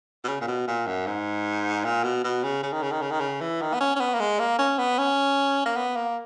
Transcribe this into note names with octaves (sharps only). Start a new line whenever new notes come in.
B2
C#3
A#2
B2
A#2
F#2
G#2
A#2
B2
B2
C#3
C#3
D#3
C#3
D#3
C#3
D#3
C#3
E3
D#3
B3
C#4
C#4
B3
A#3
G#3
A#3
C#4
B3
C#4
A#3
B3
A#3